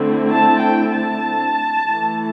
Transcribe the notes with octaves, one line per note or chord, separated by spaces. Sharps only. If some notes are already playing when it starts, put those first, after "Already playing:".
Already playing: D3 A3 C4 E4
A5
G5
A5
E3 A3 E4